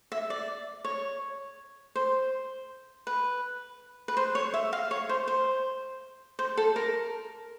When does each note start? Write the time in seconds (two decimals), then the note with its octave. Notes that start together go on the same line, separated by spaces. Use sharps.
0.12 E5
0.30 D5
0.85 C#5
1.96 C5
3.07 B4
4.08 B4
4.17 C5
4.35 C#5
4.54 E5
4.73 F5
4.91 C#5
5.09 C5
5.28 C5
6.39 C5
6.57 A4
6.76 A#4